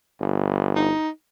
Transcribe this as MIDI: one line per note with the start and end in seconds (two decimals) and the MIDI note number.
0.21 0.91 31
0.76 1.09 63